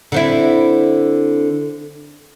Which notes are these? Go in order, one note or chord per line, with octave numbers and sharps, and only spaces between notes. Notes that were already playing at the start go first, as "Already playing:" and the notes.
D3 C4 E4